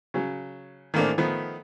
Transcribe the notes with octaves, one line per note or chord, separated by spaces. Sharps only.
C#3 F#3
D#3 E3 A3 A#3 C4 D4
D#3 F3 A3 B3